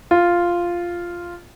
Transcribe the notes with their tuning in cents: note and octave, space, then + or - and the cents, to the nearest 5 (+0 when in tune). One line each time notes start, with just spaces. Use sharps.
F4 -5